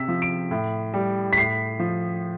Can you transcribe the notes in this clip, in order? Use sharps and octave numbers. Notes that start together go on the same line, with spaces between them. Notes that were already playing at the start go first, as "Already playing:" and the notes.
Already playing: C3 E6 B6
F3
D7
A2
G3
B6
A2 C7
F3